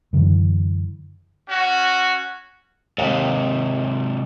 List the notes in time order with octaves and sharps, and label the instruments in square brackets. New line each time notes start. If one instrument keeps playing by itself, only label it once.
[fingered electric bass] F#2 D3 E3
[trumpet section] C#4 F#4
[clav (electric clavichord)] D#2 [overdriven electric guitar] G#2 C3